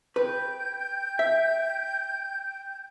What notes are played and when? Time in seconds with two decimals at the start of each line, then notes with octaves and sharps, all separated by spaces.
0.16 B4 G5 G6
1.19 E5